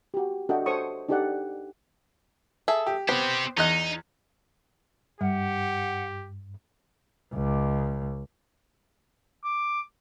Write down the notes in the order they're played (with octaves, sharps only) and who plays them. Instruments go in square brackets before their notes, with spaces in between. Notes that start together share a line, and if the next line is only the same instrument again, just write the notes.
[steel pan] F#4 G4
D4 F#4 A4 D#5 E5 G5
A4 C5 C#5 E5 C#6 D#6
D4 D#4 G4 A4 D5 F#5
[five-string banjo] G#4 A4 E5
[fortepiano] G4
[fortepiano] B3 [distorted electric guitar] C4 G4 [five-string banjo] C5
[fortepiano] E2 D#5 F#6 [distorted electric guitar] D#4
[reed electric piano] G2 [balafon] G3 [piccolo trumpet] G4 [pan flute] F#5
[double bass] C#2
[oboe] D6